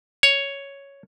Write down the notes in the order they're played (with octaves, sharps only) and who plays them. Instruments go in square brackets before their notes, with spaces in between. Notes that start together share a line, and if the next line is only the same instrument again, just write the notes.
[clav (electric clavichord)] C#5